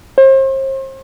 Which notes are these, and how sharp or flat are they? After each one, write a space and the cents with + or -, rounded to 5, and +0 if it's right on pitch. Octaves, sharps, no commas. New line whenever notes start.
C5 +40